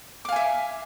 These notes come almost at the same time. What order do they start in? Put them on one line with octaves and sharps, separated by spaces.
D6 F5 G#5 E5